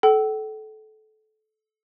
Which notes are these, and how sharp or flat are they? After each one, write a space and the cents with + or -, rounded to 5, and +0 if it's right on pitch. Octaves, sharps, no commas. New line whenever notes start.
A4 -25 G5 -45